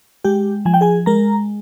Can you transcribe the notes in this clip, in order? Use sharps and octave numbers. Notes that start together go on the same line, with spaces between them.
G#3 G4 G5
F3 G#5
G5
G#4 G#5
G#3 A#4 A#5